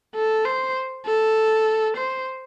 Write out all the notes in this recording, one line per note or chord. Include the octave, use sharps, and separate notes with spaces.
A4
C5
A4
C5